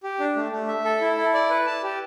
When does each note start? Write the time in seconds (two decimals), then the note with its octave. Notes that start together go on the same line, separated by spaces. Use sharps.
0.03 G4
0.20 D4
0.36 A3
0.52 A3
0.68 E5
0.85 A4
1.01 E4
1.17 E4
1.34 D5
1.50 B4
1.66 A5
1.83 G4